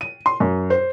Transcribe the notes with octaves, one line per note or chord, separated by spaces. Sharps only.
D#7
C6
F#2
C5